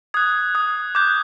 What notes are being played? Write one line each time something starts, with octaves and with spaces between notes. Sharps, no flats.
D#6 F#6 G#6
D#6 F#6
D6 F#6 G6